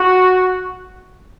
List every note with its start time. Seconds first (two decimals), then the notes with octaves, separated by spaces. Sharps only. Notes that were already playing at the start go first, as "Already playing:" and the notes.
Already playing: F#4